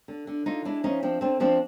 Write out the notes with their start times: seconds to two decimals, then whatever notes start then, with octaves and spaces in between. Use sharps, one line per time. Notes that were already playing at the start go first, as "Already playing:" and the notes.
0.08 D3
0.27 D3
0.46 D3 D#4 F4
0.65 G#3 D4 E4
0.83 F3 C#4 D#4
1.03 F3 C4 D4
1.21 D3 C4 D4
1.40 F3 C4 D4